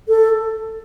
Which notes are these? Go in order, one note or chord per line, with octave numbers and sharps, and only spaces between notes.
A4